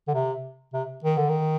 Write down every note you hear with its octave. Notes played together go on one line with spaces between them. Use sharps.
D3
C3
C3
D#3
D3
D#3